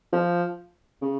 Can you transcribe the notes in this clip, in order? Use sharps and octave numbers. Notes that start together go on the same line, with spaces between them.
F3
C#3